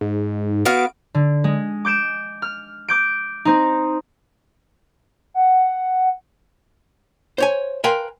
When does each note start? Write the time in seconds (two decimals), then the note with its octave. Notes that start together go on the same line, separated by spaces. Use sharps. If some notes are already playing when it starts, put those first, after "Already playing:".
0.01 G#2
0.65 B3 F#4 F5 D7
1.14 D3
1.44 G#3
1.85 D6 G6 D7 E7
2.42 F6
2.88 D6 G6 D7
3.45 C4 D#4
5.34 F#5
7.38 C5 C#5 G#5
7.84 A#4 B4 F5 G5 G#5 C6